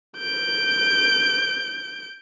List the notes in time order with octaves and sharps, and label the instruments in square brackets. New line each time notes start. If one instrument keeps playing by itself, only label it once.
[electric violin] G6 D7